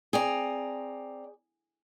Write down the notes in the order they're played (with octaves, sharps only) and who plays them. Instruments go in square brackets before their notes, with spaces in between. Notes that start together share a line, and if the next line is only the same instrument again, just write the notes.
[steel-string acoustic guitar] C4 D5 A#5 [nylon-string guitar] G#4